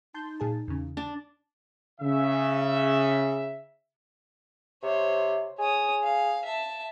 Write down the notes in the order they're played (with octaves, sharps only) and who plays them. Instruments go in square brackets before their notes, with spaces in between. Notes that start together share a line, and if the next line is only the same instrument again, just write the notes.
[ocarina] D#4 [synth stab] A5 C6 G6
[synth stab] A#2 G#4 A5
E2 C#3
[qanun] D4
[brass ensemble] C#3 E5
[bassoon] C3 [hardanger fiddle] C5 C#5
[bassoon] G#4 [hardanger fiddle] C#5 D#6
[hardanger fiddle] F5
E5 A5